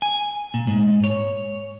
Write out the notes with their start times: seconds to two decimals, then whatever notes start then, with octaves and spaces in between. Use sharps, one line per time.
0.02 G#5
0.54 A#2
0.67 G#2
1.04 C#5